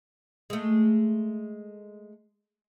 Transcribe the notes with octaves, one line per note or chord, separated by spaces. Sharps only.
G#3 A3